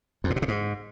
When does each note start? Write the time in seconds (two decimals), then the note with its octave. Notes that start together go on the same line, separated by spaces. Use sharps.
0.24 F2
0.30 A2
0.36 B2
0.42 C3
0.48 G#2